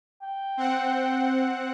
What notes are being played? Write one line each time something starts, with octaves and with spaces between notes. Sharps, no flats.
G5
C4 F#5